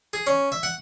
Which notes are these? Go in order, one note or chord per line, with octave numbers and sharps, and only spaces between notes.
G#4
C#4
E5
F#5